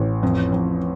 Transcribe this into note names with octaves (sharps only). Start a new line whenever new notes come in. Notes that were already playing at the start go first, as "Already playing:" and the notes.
Already playing: A1
F2
F2